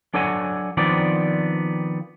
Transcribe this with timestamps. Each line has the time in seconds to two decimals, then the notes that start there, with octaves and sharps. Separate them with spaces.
0.14 F#3 D4 A4 C#5 F#5 G#5
0.77 D#3 F3 B3 C4 D4 D5